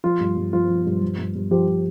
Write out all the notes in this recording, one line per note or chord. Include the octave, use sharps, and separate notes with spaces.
F3 F4
G2
G2
F3 F4
F3
G2
F3
G2
G2
F3 G4
F3